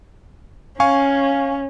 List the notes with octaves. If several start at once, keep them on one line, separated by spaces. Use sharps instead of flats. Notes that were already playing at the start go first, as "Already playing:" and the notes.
C#4 F5 G#5 C#6